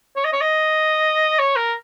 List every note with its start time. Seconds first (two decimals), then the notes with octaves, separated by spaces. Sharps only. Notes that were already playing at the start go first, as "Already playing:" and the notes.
0.16 C#5
0.24 D#5
0.32 C#5
0.41 D#5
1.39 C#5
1.56 A#4